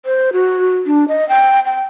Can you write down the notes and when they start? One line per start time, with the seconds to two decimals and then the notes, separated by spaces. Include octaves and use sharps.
0.06 C5
0.33 F#4
0.87 D4
1.08 D#5
1.29 G5
1.65 G5